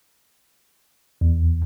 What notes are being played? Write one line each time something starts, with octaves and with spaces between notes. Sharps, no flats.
E2